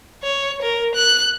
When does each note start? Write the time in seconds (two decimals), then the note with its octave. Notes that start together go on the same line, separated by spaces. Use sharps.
0.23 C#5
0.62 A#4
0.95 F#6